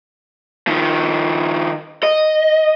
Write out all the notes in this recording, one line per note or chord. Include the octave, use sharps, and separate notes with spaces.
D#3 F3
D#5